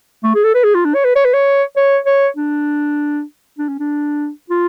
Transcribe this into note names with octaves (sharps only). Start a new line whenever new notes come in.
A3
G#4
A4
B4
G#4
F4
D4
C#5
B4
C#5
B4
C#5
C#5
C#5
D4
D4
C#4
D4
F4